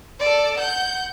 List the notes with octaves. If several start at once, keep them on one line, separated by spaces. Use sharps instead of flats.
A4 D5
F#5 G6